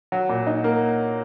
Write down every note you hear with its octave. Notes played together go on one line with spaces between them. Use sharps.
F#3
A#2
D#4
A#3